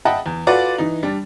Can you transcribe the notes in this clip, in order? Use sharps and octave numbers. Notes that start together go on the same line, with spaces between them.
D#5 E5 F#5 G5 A5 B5
E2
F4 F#4 A4 B4 D5 F#5
E3 D#4
G3 D4